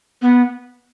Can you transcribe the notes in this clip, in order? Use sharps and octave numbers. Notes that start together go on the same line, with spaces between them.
B3